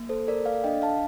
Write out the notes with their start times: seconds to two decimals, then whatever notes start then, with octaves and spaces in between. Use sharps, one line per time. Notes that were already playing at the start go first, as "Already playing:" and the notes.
Already playing: A#3
0.09 A4 C5
0.27 A4 A#4 D5
0.46 D5 F5
0.64 D4 D#5 G5
0.82 F5 A5